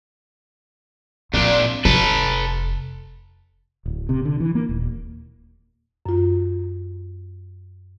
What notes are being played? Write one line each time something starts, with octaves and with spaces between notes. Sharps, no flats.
A#2 G#3 C4 D4
F1 A4 B4
D1
C3
D3
E3
A#3
D#1
F#2 F4